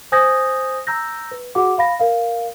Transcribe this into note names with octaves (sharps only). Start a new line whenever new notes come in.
C5 G#5 D#6 G6 G#6 A#6
A#5 E6 G6 A#6
B4
F#4 G#4 F#5 D6
F5 B5 A#6
A#4 F5